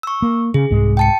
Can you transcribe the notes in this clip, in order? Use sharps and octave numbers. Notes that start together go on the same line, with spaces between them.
C#6 E6
A#3
C#3 G#4
C2 G#2 G#3
G5 A5 C#7